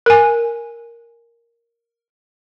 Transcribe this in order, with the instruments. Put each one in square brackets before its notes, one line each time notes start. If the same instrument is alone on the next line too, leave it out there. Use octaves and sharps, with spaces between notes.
[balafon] A#4 G#5